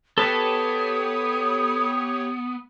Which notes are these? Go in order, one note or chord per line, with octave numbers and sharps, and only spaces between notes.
B3 G4 A4 B4 C#5 A5 D#6